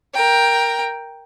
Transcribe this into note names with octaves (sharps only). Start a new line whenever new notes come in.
A#4 G5